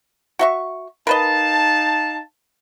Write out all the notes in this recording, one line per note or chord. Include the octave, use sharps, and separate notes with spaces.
F#4 E5 C#6
D#4 A#4 B4 D#5 F5 A5